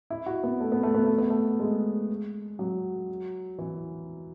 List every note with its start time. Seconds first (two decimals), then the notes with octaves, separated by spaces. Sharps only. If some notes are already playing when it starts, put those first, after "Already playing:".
0.10 E4
0.26 F#4
0.43 B3
0.60 A3
0.72 B3
0.83 A3
0.94 B3
1.06 A3
1.18 B3
1.30 A3
1.60 G#3
2.59 F#3
3.58 E3